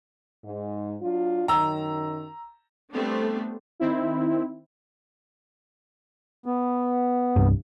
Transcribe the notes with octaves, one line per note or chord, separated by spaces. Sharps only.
G#2
F#3 D4 F4
F#2 D#3 A#5 E6
G3 A3 B3 C4 D4
D#3 C4 E4
B3
C2 G2